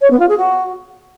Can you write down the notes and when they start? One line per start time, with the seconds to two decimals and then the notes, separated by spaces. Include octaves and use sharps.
0.01 C#5
0.11 B3
0.20 F4
0.29 G#4
0.38 F#4